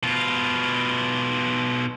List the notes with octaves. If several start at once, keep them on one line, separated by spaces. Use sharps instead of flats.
B2 F4